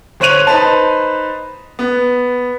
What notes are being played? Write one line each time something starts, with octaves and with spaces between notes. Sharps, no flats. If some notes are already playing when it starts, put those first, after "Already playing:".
G1 C5 C#5 F#6 D#7 F7
D#4 B4 C5 A5
B3